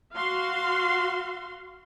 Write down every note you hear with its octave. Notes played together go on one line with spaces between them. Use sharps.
F#4 F5 C6